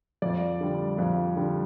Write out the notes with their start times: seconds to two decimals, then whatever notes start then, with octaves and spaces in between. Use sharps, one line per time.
0.22 F2 D5
0.61 D3 G3
0.98 F2
1.36 D3 G3